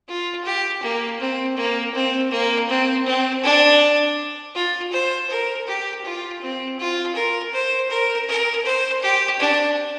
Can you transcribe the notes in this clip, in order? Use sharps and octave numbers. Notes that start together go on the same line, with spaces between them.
F4
G4
A#3
C4
A#3
C4
A#3
C4
C4
D4
F4
C5
A#4
G4
F4
C4
F4
A#4
C5
A#4
A#4
C5
G4
D4